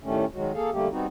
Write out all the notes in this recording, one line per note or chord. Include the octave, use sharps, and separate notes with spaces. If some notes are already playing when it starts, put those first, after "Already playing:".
A2 D#3 G3 A3 C#4
D#3 F#3 G#3 F#4
A#3 G#4 A4 F5
D3 G3 A3 A#3 G4
G3 B3 C4 D#4 F#4